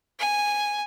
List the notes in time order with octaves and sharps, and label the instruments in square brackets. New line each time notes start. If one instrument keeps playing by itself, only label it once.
[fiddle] G#5